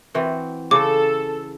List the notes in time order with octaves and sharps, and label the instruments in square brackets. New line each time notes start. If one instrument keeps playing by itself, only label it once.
[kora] E3 C4 F#4
[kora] C#3 [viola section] A4 [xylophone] D6